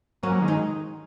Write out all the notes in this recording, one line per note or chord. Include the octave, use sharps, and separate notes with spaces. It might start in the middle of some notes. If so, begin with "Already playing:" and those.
F#3 A#3 C#4
D#3 G#3
D#4